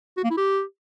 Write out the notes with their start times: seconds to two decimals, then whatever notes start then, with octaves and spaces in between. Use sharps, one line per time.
0.17 F#4
0.24 A#3
0.30 E4
0.37 G4